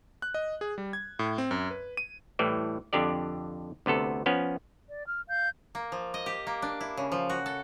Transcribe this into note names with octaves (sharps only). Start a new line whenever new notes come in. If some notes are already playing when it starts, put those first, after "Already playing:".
F#6
D#5
G#4
G3
G#6
A2
C4
F#2
B4
D#7
A2 E3 G3
F2 D3 D4 G4 D5
D2 C3 B3 A4
F3 B3 C#4
D5
F6
F5 G6
A#3
F3
D#5
G4
A#3
D4
E4
C#3
F3
F#4
A4